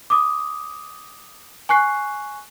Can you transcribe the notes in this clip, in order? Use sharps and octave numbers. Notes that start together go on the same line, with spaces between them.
D6 D#6
G#5 C#6 F#6 C7